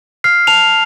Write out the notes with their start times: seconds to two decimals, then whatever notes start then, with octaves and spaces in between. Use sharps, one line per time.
0.24 F6 C7
0.47 A5 F7